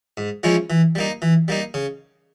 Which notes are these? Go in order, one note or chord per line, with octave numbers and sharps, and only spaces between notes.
G#2
F3 G#3 C#4 E4
E3
G3 A#3 D#4
E3
G3 A#3 D#4
C#3